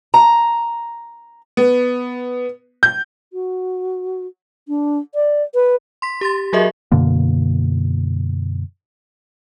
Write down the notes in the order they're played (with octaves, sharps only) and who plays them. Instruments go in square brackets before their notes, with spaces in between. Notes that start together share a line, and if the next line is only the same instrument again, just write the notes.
[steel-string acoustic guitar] A#5
[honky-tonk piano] B3
G6
[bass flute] F#4
D4
D5
B4
[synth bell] C6 B6
G4 C6 A6
F#3 F#4 G#4 A#4 D#5 E5
[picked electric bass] F#2 B2 D3 A#3